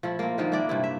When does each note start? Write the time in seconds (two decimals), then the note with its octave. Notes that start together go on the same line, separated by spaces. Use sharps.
0.03 F3 A3 E4
0.19 A#3 C4
0.38 D3 D#3 F3 A#3
0.52 A#3 D4 E4 D5
0.69 G2 C3 E4
0.84 E5